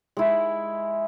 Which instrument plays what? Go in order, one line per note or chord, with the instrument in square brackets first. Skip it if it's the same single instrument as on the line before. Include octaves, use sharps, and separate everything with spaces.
[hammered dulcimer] G#3 E4